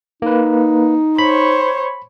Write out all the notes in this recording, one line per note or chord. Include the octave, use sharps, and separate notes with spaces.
A#3 D#4 B4
C5 C#5 B5